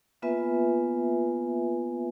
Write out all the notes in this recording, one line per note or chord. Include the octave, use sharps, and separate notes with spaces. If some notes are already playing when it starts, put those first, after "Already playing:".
A#3 B3 F4 B4 E5 G#5